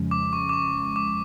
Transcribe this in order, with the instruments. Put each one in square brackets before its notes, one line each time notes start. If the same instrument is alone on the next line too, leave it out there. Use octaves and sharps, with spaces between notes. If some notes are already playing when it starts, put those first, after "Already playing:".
Already playing: [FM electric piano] F2 C#3 F3 G#3 C#4
[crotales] D6
C#6
D6
C#6
D6